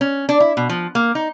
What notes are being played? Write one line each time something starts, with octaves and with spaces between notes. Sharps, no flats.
C#4
D4
E4
B2
F3
A#3
D#4